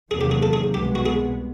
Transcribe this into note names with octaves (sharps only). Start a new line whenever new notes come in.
E2 C3 D#3 F#3 A#3 G#4
G4
G#4
A4
G#4
C2 B2 G#3 B3 G4
F#4
G#4